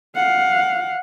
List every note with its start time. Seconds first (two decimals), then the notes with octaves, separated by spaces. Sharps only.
0.16 F5 F#5